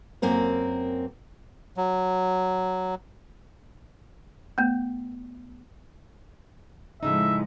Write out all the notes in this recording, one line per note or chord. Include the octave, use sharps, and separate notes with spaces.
F#2 A#3 C4 A#4
F#3
A3 B3
A2 C#3 F3 G#3 D#4 E5